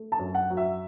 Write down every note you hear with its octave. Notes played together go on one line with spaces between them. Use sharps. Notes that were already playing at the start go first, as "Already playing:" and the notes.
Already playing: A3
A5
F#2
F#5
F#3
E5